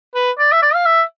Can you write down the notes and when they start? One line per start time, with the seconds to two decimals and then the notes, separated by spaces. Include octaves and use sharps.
0.15 B4
0.39 D5
0.52 E5
0.62 D5
0.74 F5
0.86 E5